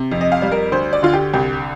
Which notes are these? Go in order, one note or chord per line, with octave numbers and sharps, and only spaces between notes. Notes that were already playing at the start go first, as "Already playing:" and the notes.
Already playing: C3
F2
D#5
F5
G3
A#4
D2 C5
D5
D3 F4
G4
C2 G4